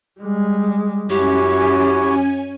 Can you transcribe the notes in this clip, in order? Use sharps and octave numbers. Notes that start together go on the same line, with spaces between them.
G3 G#3
F#2 C#4 E4 F#4 G4 C#5 G#5